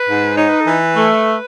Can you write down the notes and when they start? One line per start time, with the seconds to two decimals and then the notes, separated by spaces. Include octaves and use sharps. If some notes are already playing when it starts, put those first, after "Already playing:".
Already playing: B4
0.08 G#2
0.37 D#4 C#5
0.49 B4
0.61 A4
0.67 E3 B4
0.96 A3